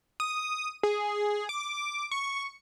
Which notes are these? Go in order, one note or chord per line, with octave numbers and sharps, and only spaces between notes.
D#6
G#4
D6
C#6